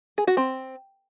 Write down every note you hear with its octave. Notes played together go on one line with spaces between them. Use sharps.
G#4
F#4
C4